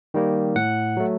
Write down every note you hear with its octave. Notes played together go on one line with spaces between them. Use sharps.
D#3 G3 A#3
A2 F#5
F#3 A3